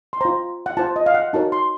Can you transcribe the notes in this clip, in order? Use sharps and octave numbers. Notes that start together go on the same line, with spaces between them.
C6
F4 C5 A#5
F#5
F4 C5 A5
D#5
F5
F#5
D#4 F#4 A#4 C#5 A5
C6